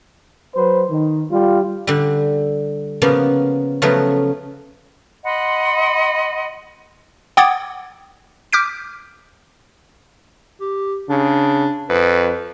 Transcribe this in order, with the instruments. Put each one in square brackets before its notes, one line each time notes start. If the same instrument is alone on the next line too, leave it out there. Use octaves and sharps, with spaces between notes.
[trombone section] F#3 B4 C5
D#3
G3 F4
[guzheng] D3 G3
C#3 F3 A#3 B3
C#3 F3 F#3 A3 B3
[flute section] D#5 F#5 B5 C6
[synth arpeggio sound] F#5 G5 D6 D#6 G#6 A6
D6 F6 G6 B6 D7
[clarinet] G4
[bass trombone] C#3 [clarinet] D4
[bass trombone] F2 [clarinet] B4